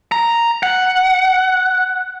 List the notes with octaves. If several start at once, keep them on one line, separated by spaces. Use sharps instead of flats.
A#5
F#5